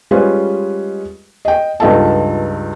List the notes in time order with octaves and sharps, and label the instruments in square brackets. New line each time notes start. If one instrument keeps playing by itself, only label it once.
[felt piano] G3 G#3 C#4 F4 B4 C5
D#5 G5
C#2 G2 D#4 F4 A4 A5